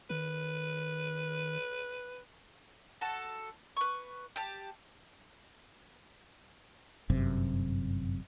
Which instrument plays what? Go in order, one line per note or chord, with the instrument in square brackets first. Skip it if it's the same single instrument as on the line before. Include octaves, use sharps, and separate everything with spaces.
[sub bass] D#3 [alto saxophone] B4
[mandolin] F#4 A4 A5
B4 C#6
G4 A5
[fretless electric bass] G1 F#2 C3